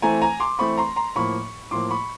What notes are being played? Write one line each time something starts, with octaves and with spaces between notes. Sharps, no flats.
E3 A3 C4 G#5 A#5
G#5 A#5
C6 D6
E3 A3 C4 B5 C#6
A#5 C6
A#5 C6
A2 F3 A#3 B5 C#6
A2 F3 A#3 C6 D6
B5 C#6